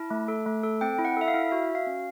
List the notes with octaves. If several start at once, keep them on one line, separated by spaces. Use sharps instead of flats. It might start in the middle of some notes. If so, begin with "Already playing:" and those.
Already playing: E4 A5
A3
A4
A3
A4
C4 G5
E4
F#5
A4 E5
F5
E4
F#4 E5
F#4
F5
C#4